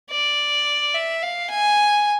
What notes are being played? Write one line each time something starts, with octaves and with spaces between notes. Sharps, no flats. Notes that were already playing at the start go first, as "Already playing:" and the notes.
D5
E5
F5
G#5